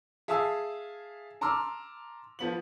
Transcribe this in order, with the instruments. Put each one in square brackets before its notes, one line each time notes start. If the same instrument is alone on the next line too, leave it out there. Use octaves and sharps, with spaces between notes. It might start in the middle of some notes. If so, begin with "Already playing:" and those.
[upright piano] G#4 E5 F5 A5 D#6 E6
A5 A#5 C6 D6 E6 F6
F3 B3 F#7